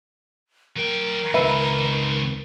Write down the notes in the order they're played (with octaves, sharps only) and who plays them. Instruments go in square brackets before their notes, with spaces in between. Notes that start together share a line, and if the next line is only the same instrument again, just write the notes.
[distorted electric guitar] F#3 G5 [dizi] A#4
[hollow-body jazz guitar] C#2 E5 [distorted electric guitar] D#3 C4 [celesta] B4 B5 D#7